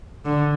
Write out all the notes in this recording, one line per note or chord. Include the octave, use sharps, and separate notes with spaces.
D3